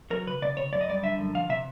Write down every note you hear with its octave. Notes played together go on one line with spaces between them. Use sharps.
F#3 A#4
C#3 B4
C#3 D5
C#3 C#5
F#2 D5
D#5
G3 D5
D3 E5
F#2
F3 F5
C3 E5